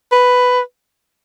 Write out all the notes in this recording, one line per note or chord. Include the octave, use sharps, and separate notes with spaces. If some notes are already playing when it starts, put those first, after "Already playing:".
B4